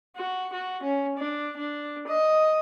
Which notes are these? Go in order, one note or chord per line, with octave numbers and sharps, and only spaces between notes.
F#4
F#4
C#4
D4
D4
D#5